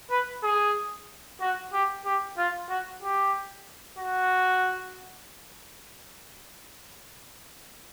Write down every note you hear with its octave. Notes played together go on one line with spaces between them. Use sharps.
B4
G#4
F#4
G4
G4
F4
F#4
G4
F#4